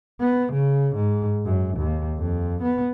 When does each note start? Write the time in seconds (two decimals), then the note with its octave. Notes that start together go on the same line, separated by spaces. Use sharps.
0.20 B3
0.53 C#3
0.96 G#2
1.45 F#2
1.77 D#2
2.18 F2
2.62 B3